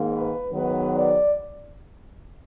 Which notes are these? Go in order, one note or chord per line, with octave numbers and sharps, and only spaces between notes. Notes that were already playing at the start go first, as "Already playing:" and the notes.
Already playing: G#2 D#3 A#3
B4
G#2 D#3 F#3 B3 B4
D5